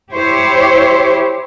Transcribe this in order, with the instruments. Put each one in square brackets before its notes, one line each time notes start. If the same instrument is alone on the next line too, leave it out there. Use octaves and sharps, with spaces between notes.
[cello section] E4 G4 C5 C#5